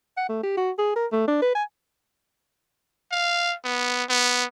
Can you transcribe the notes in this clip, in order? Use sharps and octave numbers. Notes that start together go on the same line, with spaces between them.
F#5
A3
G4
F#4
G#4
A#4
A3
D4
B4
G#5
F5
B3
B3